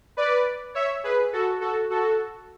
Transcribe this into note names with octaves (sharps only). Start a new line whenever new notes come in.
B4 D5
C#5 E5
G#4 B4
F#4 A4
F#4 A4
F#4 A4